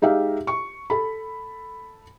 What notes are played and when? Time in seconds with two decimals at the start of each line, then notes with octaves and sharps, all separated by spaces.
0.02 G#3 D#4 G4 E5 F5
0.47 C#6
0.90 A4 B5